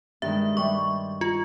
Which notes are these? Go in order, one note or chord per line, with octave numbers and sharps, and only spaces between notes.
G2 D#3 G#3 E5
G2 G3 C6 C#6
F4 A#5